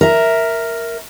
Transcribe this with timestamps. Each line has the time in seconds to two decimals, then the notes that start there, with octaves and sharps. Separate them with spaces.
0.01 A#4 E5